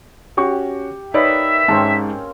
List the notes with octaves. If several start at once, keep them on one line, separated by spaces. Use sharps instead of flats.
C#4 F#4 G4 C#6
A#3 D#4 B4 C#5 D5 E5
G#2 A#3 C4 C#4 A5